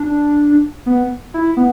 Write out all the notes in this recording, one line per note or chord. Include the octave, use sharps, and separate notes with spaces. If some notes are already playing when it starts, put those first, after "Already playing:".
Already playing: D4
B3
E4
B3